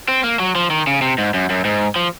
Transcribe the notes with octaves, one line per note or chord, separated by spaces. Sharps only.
C4
A#3
F#3
F3
D#3
C#3
C3
G#2
F#2
F#2
G#2
F3